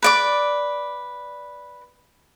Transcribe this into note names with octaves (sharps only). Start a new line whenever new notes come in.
B4 D5 D6